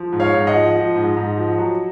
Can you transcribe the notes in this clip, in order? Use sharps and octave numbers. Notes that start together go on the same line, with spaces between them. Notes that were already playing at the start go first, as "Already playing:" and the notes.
Already playing: F3
G#2
C#5 F5
G#2
D#5 F#5
F3
F3
G#2
G#2
F3
F#3